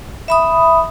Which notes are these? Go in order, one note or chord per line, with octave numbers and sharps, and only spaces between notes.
E5 B5 D#6